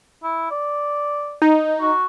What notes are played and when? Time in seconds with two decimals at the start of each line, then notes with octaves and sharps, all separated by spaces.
0.23 E4
0.51 D5
1.42 D#4
1.81 F#4